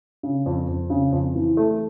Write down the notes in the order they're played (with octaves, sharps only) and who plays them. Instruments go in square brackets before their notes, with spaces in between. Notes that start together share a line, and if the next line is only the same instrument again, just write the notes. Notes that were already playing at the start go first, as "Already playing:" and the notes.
[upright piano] C#3
F2
F2
C#3
F2
E3
A3